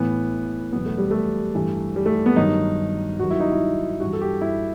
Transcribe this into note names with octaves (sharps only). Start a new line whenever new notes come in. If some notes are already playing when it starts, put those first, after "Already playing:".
Already playing: A2 E3 B3
E2 B2 F#3 B3
A3
G3
A3
G2 E3
G3
A3
B3
G2 D#3 F#3 D#4
G2 D#3 F#3 F#4
E4
D#4
E4
G2 E3 F#4
A4
G4
E4